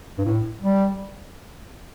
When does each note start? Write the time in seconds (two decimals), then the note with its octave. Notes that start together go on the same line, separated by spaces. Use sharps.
0.18 G2
0.25 A2
0.62 G3